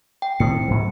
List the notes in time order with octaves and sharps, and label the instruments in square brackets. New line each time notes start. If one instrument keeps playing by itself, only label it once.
[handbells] G5
[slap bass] A2 D#3 C4 [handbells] C#7
[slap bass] G#2 F#3